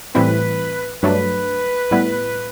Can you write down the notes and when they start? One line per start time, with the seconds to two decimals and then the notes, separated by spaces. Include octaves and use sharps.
0.15 A2 E3 G3 C4 E4 B4
1.03 G2 F#3 A3 D4 B4
1.91 A2 G3 B3 E4